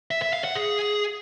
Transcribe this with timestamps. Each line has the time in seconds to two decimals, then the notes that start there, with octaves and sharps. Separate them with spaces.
0.11 E5
0.22 E5
0.33 F5
0.44 F#5
0.55 G#4